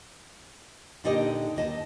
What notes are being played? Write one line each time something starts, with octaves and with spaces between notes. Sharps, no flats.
A#2 D3 D#4 G4 D#5
D#2 D#5 A5